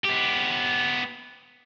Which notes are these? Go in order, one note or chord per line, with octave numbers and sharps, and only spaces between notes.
B3 G4